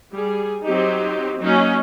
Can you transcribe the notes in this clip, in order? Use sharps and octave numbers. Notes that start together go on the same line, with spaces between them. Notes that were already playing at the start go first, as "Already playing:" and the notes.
G3 G#4
F#3 C4 D#4 G4
F#3 A#3 C#4 D#4